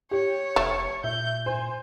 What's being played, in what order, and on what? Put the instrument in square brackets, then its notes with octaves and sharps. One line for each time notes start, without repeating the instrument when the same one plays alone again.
[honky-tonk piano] G4 [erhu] C#5
[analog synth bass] F1 [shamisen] A3
[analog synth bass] A#2 [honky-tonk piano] E5 [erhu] G6
[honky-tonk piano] C5 [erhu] G#5